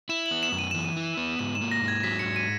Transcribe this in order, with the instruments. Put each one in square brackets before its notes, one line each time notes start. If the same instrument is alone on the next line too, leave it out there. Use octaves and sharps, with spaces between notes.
[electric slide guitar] E4 [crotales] E7
[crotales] F#7
[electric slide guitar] B3
[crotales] E7
[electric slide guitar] F#2
[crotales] D#7
[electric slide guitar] E3 [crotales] E7
[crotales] D#7
[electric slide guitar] E4
B3
[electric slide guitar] G#2 [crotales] E7
[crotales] E7
[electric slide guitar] A#3
[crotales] A#6
[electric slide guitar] G#2
[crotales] G#6
[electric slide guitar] F#3 [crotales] B6
[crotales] C#7
[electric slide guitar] G#2
[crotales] D#7